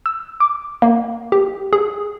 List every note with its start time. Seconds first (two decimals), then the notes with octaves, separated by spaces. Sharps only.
0.06 E6
0.40 D6
0.82 A#3
1.32 G4
1.73 G#4